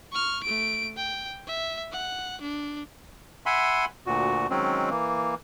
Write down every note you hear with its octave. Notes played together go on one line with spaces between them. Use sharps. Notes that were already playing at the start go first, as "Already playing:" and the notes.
C#6 F6
A3 D7
G5
E5
F#5
D4
E5 F#5 G#5 B5 C6
D2 A#2 F#4
D#3 F#3 G#3 C4 C#4
E3 A#3